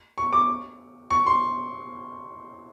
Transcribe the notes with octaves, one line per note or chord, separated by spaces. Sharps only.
C#6
D6
C#6
C6